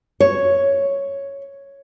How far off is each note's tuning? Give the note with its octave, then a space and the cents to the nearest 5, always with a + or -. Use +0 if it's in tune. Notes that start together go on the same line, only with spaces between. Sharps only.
C#5 +0